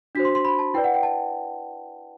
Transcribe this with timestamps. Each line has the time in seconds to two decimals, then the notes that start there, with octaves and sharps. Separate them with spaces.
0.15 D4 F#4 C5 B6
0.25 C6
0.35 C6
0.45 B5
0.59 A5
0.74 E4 B4 D5 G5
0.84 F#5
0.94 G5
1.03 A5